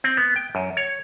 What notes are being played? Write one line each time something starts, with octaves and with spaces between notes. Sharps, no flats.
C4
B3
G5
F#2
C#5